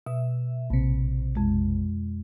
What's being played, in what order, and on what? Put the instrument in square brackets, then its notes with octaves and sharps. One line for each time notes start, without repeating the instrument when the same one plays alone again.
[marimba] B2 [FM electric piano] E5
[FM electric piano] A#1 C3
[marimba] F2 G#3